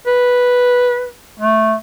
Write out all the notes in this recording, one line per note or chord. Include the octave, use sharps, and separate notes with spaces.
B4
A3